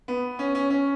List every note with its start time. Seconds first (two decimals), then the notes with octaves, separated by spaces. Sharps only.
0.08 B3
0.39 C#4
0.55 C#4
0.70 C#4